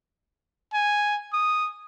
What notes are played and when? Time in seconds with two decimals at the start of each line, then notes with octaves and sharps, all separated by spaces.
0.73 G#5
1.33 D#6